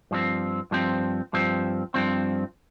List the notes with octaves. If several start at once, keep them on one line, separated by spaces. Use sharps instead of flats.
G2 F3 C4
G2 F3 C4
G2 F3 C4
G2 F3 C4